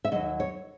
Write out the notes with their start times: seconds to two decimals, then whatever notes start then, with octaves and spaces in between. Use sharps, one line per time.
0.05 E5
0.11 D#2 D#3 F#3 D#5
0.40 C#5